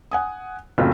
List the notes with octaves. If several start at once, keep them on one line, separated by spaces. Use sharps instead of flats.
F#5 G#5 D#6
F#1 A2 C4 F4 F#4